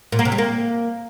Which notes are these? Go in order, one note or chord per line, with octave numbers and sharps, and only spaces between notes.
A#2
A#3
C3
G3
A#3